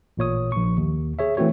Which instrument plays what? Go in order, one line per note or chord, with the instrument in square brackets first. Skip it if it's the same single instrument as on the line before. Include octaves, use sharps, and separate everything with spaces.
[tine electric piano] A1 A#2 C#5 D#6
A#1 C#6
D#2
G#4 C#5 E5
E3 A3 C4 F#4 C#5